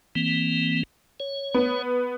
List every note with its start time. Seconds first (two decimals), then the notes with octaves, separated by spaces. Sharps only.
0.15 E3 A#3 C4
1.20 C#5
1.54 B3